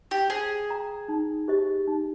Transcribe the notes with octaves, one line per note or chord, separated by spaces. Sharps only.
G4
G#4 C5
G5 A#5
D#4
G4 C5 D#5
D#4